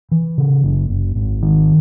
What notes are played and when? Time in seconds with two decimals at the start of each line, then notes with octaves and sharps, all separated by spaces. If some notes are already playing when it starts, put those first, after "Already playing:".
0.12 E3
0.38 C#3
0.64 F#1
0.90 F#1
1.16 G#1
1.42 D#3